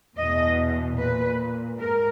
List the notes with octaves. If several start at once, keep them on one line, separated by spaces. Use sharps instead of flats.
E2 B2 D#5
A#2 B4
G#2 A#4